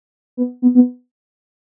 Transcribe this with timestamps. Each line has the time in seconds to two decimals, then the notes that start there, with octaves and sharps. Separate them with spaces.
0.37 B3
0.62 B3
0.75 B3